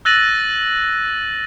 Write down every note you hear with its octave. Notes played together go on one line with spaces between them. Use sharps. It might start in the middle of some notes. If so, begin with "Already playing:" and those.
E6 F#6 A6 A#6 D#7 F#7